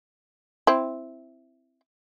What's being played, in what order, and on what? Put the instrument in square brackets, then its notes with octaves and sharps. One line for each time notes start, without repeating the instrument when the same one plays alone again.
[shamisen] C4 E4